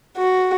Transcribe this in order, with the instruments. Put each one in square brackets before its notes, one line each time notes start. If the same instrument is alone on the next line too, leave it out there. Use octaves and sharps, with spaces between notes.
[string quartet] F#4